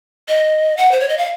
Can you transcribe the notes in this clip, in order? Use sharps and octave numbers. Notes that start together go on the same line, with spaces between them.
D#5
F#5
C5
C#5
D#5
F5